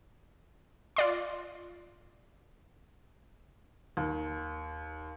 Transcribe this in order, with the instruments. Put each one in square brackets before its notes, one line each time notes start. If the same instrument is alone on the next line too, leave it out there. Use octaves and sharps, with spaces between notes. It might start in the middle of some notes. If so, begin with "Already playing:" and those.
[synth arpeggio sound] F4 D5 C6
[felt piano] D#2